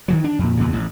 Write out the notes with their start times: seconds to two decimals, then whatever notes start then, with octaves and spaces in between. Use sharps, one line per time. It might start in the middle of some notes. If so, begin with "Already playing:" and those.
0.08 D#3 E3 F#3
0.24 D4
0.39 F2 A#2
0.57 E2 A#2 C#3
0.73 A1